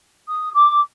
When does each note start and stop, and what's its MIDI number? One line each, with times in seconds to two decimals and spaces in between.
0.28 0.50 87
0.55 0.80 86